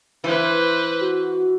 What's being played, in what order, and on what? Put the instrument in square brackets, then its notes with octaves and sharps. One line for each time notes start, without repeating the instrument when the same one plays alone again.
[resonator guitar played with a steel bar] E3 [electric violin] B4 C5
[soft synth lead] F#4